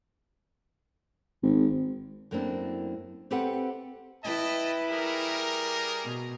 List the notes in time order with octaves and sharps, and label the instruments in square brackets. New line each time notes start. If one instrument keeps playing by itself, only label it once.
[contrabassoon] G#1
[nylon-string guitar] F#2 A3 A#3 C4 D4 E4
C4 G4 A4 B4 E5 F#5
[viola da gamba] E4 B4 [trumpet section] D#5 G5 A5
[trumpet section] G3 G#4 A#4
[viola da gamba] B2